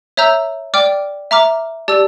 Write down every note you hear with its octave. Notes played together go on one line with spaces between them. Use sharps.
C#5 E5 A#5 E6 G6
D5 G5 D6 F6
E5 A#5 D6 F6
G4 D5 A5 E6